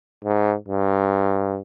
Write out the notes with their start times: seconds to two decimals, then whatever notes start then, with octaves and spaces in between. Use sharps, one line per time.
0.25 G#2
0.68 G2